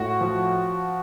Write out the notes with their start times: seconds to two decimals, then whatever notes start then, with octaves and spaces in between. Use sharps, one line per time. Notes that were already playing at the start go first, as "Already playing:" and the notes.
Already playing: A2 F#4
0.21 F3